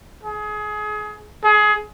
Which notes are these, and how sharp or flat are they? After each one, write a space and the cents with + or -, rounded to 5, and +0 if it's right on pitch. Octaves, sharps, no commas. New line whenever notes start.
G#4 +25
G#4 +25